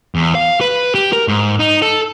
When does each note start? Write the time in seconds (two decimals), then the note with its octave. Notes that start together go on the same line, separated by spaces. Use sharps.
0.15 E2
0.35 F5
0.61 B4
0.95 G4
1.13 A#4
1.28 G#2
1.59 D#4
1.82 A4